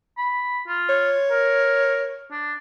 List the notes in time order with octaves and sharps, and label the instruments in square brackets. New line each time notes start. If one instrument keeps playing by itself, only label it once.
[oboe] B5
F4
[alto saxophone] C#5
[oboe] A#4
D4